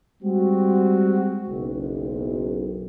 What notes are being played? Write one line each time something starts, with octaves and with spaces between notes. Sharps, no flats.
G3 G#3 C4 F#4
F#1 B1